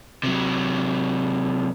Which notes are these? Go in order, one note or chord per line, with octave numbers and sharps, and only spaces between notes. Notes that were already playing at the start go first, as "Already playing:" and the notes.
C3 F#3